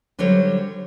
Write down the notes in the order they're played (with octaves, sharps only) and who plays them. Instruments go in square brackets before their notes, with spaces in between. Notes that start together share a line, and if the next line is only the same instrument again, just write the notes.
[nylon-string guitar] D3 F#3 G3 A4 C5 C#5